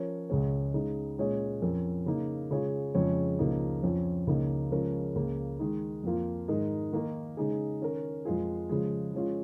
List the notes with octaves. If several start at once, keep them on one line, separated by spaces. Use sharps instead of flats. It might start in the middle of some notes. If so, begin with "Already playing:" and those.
Already playing: F3 C#4 A#4 C#5
C#2 C#3 G#3 C#4
C#3 G#3 D#4
A#2 G#3 C#4 G#4 C#5
F2 F3 C#4 A#4
C#3 A#3 D#4
C#3 G#3 F4 G#4 C#5
F2 C#3 F3 G#3 C#4
C#2 C#3 F3 A#3 D#4
F2 F3 C#4
C#2 C#3 A#3 D#4
C#3 F3 G#3 C#4 A#4
C#2 C#3 A#3
D#3 G#3 D#4
F2 F3 A#3 F4
G#2 D#3 G#3 D#4 A#4
D#3 A#3 D#4 A#4
C#3 G#3 D#4 G#4
D#3 C#4 A#4
F2 F3 G#3 F4 G#4
C#3 F3 G#3
F3 G#3 C#4 F4